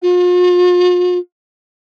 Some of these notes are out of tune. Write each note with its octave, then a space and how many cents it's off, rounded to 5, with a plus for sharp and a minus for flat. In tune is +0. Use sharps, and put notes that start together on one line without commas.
F4 +45